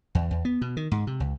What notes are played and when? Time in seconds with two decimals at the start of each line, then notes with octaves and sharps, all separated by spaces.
0.15 E2
0.31 E2
0.45 B3
0.61 B2
0.77 D#3
0.92 G#2
1.07 C3
1.20 C#2